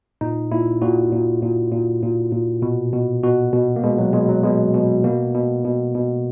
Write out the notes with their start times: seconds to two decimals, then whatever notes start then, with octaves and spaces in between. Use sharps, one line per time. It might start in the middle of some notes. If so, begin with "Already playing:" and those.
0.21 A#2 D#4
0.51 A#2 E4
0.82 A#2 F#4
1.12 A#2
1.42 A#2
1.72 A#2
2.02 A#2
2.32 A#2
2.62 B2
2.93 B2
3.23 B2 F#4
3.53 B2
3.76 A#3
3.83 B2 G#3
3.98 F#3
4.14 B2 G#3
4.28 F#3
4.44 B2 G#3
4.74 B2
5.04 B2 A#3
5.35 B2
5.65 B2
5.95 B2